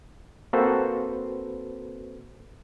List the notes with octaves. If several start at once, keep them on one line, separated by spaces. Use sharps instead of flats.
A#3 C4 F#4 A4 B4 C5